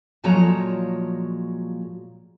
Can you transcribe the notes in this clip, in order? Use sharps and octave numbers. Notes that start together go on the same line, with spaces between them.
A#2 F3 F#3 G#3 C#5 A#5